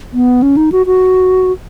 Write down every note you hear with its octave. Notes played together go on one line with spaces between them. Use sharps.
B3
C#4
D#4
F#4
F#4